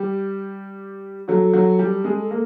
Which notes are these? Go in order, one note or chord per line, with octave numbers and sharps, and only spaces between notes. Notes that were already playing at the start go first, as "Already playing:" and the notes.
Already playing: G3 G4
F#3 F#4 A4
F#3 F#4
G3 G4
G#3 G#4
A#3